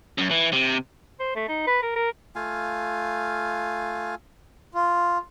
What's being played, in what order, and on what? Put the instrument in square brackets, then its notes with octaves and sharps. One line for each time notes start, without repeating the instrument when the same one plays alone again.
[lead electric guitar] F#2
E3
C3
[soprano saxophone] C5
A3
D#4
B4
A#4
A#4
[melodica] A3 F4 F5 G#5
[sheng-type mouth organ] F4